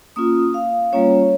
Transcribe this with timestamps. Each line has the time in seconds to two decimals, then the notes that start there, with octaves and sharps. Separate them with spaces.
0.16 A#3 C#4 F4 D#6
0.54 F5
0.93 G3 A#3 C#4 F4 C#5